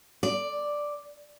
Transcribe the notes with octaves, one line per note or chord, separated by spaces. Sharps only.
D5